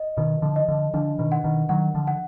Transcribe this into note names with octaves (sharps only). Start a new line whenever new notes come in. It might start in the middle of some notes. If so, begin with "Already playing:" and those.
Already playing: D#5
B2 D#3 D#5
D3 F3
D#5
D3 F3
D3 F3 D4
B2 D#3
F#5
B2 D#3
D#3 F#3 F#5
D3 F3
F#5